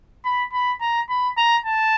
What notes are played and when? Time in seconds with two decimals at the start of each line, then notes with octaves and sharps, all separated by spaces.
0.25 B5
0.53 B5
0.81 A#5
1.09 B5
1.37 A#5
1.66 A5